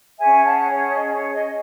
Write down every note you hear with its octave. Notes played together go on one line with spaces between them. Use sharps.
C#4 G#4 C#5 E5 G#5
F#5 A5
C#5
D#5
C#5
D#5